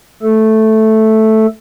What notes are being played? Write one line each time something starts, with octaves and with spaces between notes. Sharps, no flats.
A3 A4